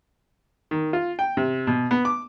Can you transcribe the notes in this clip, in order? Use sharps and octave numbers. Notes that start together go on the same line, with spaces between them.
D#3
F4
G5
C3
B2
B3
D6